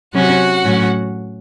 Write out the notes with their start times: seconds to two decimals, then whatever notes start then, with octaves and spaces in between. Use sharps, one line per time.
0.14 C3 F#3 C#4 F#4 F#5
0.64 A2 F#3 C#4